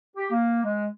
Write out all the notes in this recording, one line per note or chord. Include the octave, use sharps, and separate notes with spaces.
G4
A#3
G#3